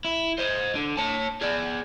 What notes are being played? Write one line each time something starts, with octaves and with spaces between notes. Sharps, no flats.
E4
C5 D#5
D3
C#5 A5
G#4 D5